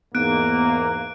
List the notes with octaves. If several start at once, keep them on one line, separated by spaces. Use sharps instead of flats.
E2 G#2 A#3 B3 F#6 D7